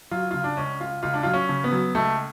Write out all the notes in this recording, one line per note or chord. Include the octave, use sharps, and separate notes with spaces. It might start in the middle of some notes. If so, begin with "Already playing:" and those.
F#3 F4
C#3 F4
D4
C#2 C#4
C#2 F4
C#2 F4
D4
F#3 F4
C#4
C#3
B3
F#3
C#2 A3